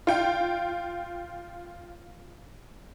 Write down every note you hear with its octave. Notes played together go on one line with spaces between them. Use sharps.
F4 G5